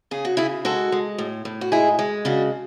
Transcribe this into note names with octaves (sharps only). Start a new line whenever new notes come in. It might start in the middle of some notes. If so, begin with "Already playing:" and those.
C#3 G#4
F#4
C#3 E4 G#4
G#3 F#4 A4
G#3
A2
A2
F#4
G#3 E4 G#4
G#3
C#3 D4 F#4